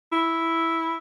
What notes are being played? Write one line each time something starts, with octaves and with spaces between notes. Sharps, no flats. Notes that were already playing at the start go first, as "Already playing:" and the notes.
E4